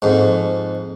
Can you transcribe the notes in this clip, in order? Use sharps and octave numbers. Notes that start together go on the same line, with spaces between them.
F2 G#2